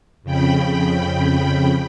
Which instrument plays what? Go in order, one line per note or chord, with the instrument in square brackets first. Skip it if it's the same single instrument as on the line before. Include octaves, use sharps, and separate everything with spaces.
[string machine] F2 C#3 G5 B5